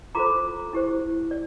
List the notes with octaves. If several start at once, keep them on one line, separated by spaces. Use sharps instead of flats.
F4 A4 C5 A#5 D6
E4 G4 C5
D5